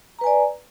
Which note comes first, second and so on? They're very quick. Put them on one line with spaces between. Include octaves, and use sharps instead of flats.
A#5 B4 G#5 D5